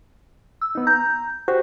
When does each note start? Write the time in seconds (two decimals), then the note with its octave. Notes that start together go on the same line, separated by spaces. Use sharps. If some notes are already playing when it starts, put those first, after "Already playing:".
0.62 E6
0.75 B3 D#4
0.87 A#5 G6
1.48 F#4 G4 C5